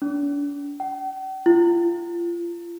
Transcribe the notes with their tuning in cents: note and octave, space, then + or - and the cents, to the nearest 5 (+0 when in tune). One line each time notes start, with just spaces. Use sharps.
D4 -45
G5 -45
F4 -30